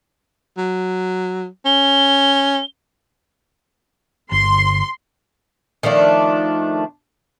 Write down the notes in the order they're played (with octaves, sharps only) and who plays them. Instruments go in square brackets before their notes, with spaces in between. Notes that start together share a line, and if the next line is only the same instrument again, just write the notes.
[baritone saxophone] F#3
[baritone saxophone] C#4 [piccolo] G7
[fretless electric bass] G1 [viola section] C6
[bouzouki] D#3 F3 A3 D4